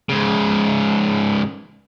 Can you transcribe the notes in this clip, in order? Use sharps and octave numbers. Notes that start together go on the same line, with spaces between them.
G#2 C#3